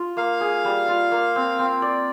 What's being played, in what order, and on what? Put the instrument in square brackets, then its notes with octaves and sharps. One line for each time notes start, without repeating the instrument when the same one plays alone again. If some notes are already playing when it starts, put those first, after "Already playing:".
Already playing: [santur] F4
[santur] A#3 [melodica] F5
[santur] G#4
G3
F4
A#3
C4
C4
D5